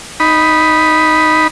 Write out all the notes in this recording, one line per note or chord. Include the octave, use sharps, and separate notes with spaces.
D#4 B5